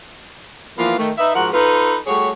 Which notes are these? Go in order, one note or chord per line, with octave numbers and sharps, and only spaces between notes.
E3 F3 A#3 B3 F4 A#4
D#3 A3
D#4 B4 D#5 E5
G#2 F3 F#4 A#4 F#5
D#4 F4 A4 B4
G3 A3 F#4 G#4 C#5